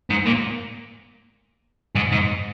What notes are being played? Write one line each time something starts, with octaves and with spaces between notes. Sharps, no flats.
G#2
A#2
G#2
G#2